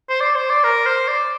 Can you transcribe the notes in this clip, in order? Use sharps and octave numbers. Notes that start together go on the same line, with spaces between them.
C5
D5
C5
D5
A#4
C5
D5